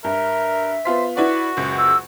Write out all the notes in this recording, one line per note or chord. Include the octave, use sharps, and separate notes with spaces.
G2 A#4 E5
B3 F4 C5 B6
E4 F#4 B4 D5 F#5
F#1 C#2
E6